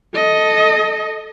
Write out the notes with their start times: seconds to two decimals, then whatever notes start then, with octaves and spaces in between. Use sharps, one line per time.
0.14 A4 D#5